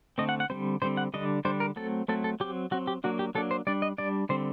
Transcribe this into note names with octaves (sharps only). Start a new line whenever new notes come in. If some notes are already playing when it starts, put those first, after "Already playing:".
D3 A3 C4 D#5
F#5
F#5
D3 G3 C4 C5
D3 G3 C4 C5
F#5
D3 G3 D4 D#5
D3 G3 D4 C5
A#4
F#3 A3 C4 A4
F#3 A3 C4 A4
A4
F#3 C4 G4
F#3 C4 F#4
G4
F#3 A#3 D4 F#4
G4
F#3 A#3 D4 A4
C5
G3 D4 D5
D#5
G3 D4 D5
D3 G3 C4 C5